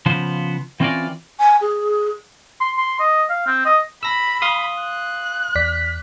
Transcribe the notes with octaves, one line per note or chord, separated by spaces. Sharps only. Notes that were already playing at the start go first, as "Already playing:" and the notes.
C#3 F3 B3 C5
E3 C4 C#4 F4 A#4 D5
G#5
G#4
C6
C6
D#5
F5
C4
D#5
B5 E6 A#6
F5 C6 D#6
F#6
E2 D5 B6